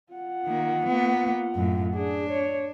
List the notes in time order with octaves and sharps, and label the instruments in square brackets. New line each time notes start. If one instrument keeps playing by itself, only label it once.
[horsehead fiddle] F4 F#5
[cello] D#3 A#3
A#3 B3
F#2 A2
[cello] D4 [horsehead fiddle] G#4
[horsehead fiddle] C#5